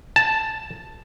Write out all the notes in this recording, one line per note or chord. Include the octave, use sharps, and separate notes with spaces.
A5